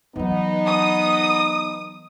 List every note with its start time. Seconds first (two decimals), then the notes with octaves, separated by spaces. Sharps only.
0.16 E3 F#3 B3 D#4
0.66 D#6